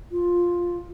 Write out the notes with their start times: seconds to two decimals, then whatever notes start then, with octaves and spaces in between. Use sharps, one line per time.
0.12 F4